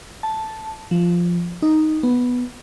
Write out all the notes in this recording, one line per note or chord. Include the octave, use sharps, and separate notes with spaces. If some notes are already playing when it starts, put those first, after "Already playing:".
A5
F3
D#4
B3